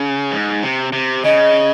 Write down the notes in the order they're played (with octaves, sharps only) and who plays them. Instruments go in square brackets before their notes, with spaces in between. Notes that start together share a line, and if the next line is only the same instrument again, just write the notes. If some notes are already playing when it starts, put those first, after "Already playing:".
Already playing: [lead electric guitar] C#3
G#2
C3
C3
[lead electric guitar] C#3 [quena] D#5